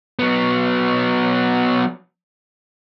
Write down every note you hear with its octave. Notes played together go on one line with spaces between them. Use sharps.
F#3 B3